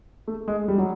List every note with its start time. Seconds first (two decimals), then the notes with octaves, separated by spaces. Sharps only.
0.28 A3
0.48 G#3
0.68 G3
0.78 F#3